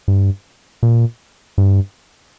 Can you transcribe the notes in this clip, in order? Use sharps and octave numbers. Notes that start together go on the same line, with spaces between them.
G2
A#2
G2